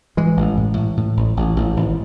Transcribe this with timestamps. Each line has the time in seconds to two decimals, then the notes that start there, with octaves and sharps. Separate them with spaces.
0.17 A2 E3 G#3
0.37 A1
0.57 A2
0.77 A2
0.97 A2
1.17 A1
1.37 A1
1.56 A1
1.77 G#1